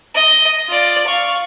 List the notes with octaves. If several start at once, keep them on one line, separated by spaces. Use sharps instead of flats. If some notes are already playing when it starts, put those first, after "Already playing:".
D#5
F4 D5
F5 C#6